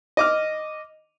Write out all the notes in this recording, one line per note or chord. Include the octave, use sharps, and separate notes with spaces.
D#5 D6 F6